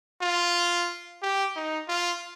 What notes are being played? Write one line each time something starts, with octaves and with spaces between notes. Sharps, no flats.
F4
G4
D#4
F4